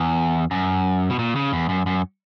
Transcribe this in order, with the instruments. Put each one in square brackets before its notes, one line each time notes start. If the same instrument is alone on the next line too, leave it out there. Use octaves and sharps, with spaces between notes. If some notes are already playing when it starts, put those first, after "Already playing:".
Already playing: [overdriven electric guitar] E2
F#2
B2
A#2
C#3
E2
F#2
F#2